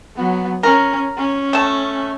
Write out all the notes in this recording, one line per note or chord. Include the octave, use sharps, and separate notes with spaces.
F#3 B3
C#4 A#4
C#4
A3 A5